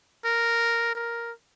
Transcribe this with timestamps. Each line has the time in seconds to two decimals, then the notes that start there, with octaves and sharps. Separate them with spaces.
0.25 A#4
0.95 A#4